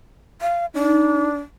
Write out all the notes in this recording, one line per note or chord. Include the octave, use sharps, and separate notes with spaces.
F5
D4 D#4